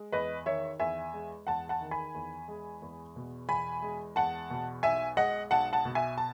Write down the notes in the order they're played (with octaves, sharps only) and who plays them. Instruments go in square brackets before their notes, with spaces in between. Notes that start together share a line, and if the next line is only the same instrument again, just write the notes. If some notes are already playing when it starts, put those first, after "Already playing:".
Already playing: [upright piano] G#3
E2 B4 D#5
D#3 C#5 E5
E2 E5 G#5
G#3
E2 F#5 A5
F#5 A5
D#3
G#5 B5
E2
G#3
E2
B2
E2 G#5 B5
G#3
E2 F#5 A5
B2
B1 E5 G#5
G#3 D#5 F#5
B1 F#5 A5
F#5 A5
B2
E5 G#5
A5